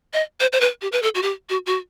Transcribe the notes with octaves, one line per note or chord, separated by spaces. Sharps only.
D#5
C5
C5
B4
G4
B4
A4
F#4
G4
F#4
F#4